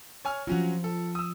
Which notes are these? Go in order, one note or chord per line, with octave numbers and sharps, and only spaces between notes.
C#5 G#5 F6
F3 F#3 C#4 F4 F#4
A4
D#6 E6